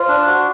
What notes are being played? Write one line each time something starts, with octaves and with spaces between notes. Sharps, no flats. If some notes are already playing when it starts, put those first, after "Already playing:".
Already playing: F4 C5
D4
F#4